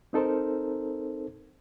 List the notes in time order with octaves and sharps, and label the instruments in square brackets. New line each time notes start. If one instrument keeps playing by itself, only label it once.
[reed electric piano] C4 D#4 A4 A#4 C5